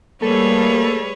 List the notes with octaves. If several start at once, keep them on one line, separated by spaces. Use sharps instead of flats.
G3 A3 A#3 G#4 A4 B4 C#5